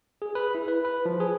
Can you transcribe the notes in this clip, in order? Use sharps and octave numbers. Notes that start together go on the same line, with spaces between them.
G#4
B4
E4
B4
B4
F3
G#4